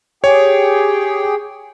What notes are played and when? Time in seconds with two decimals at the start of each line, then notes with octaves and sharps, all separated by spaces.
0.24 G4 G#4 C#5 G5